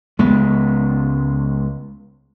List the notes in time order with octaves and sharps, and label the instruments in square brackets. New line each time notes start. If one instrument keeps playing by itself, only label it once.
[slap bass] C#2 G#3 B3